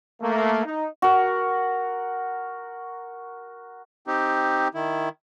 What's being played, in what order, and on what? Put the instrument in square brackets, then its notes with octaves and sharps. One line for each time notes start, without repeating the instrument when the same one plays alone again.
[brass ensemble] A3 A#3
D#4
[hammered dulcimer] F#4 A#4
[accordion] C4 D#4 G4
D#3 E4